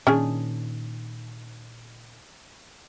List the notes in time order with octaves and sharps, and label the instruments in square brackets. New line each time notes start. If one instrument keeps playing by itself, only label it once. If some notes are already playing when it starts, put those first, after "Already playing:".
[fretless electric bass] A#2 D#3 [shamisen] C#4 D4 G#4